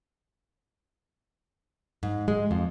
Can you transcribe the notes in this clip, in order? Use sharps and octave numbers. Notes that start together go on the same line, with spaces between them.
G#2
G#3
F2